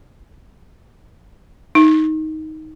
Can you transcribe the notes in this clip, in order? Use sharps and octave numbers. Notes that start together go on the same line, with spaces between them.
D#4